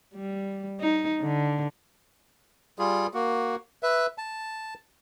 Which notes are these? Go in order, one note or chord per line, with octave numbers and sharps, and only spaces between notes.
G3
D#4
D3
G3 F4 G#4
A#3 F#4
B4 E5
A5